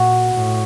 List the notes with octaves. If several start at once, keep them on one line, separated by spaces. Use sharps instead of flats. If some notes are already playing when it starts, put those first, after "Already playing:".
Already playing: A#2 F#4
A2